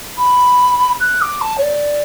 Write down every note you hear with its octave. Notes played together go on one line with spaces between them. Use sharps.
B5
F#6
D6
A5
C#5
D5